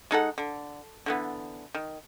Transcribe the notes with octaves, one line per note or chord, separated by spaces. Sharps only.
G#3 D#4 A4 F#5
D3
D3 E3 B3
D#3